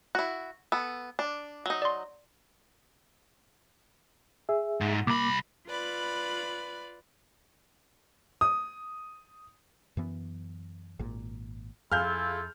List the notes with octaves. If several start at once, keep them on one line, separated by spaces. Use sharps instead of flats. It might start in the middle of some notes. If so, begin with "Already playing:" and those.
E4 F#4 F#6
B3 A4 E6
D4
F#3 D#4
D5 C6
G#4 E5
G#2
C2 A#3 B5 D6
F4 B4 D5 B5
D#6
F#2 E3 B3
G#1 A#2
F2 E4 F4 G#4 A4 F5 F6 G6